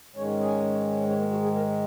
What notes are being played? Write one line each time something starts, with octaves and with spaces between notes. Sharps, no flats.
G#2 D#3 G#3 C#4 C#5
G#4
C#4 C#5
A#3 A#4
F#4
G#4
A#3 A#4